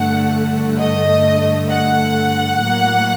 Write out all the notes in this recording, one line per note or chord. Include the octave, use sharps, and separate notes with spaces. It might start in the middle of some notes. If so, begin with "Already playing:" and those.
Already playing: G2 D3 A3 F#5
D#5
F#5
A2 F#3 A#3